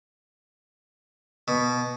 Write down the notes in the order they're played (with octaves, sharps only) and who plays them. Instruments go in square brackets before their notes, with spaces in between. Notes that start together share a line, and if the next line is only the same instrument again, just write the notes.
[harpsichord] B2